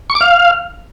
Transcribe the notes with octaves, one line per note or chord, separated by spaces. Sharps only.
C#6
D6
F5